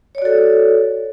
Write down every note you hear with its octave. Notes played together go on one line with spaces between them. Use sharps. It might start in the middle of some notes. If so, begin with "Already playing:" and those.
F#4 A4 C#5 D5